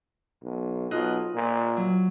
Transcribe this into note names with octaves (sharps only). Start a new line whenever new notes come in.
B1
B1 F4 D#5 F#6
A#2
F#3